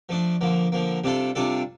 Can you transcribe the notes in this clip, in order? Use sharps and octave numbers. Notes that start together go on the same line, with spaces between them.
F3 A3 D4
D3 F3 A#3
D3 F3 A#3
C3 G3 D4 F4 A4
C3 G3 D4 F4 A4